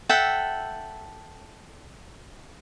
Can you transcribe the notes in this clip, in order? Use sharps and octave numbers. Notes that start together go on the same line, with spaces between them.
A4 E5 F#5 G5